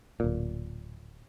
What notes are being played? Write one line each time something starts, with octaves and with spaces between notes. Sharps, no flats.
D1 A#2